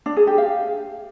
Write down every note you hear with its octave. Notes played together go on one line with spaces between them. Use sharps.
D4
G#4
G4
F5